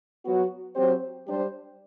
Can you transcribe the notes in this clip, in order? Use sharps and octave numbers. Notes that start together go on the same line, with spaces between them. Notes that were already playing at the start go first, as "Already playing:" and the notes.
F#3 B3 F#4
F#3 C4 G4 C5
G3 D4 G4 C5